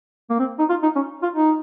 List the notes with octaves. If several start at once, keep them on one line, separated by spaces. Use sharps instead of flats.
A#3
C4
D#4
F4
D#4
C#4
F4
D#4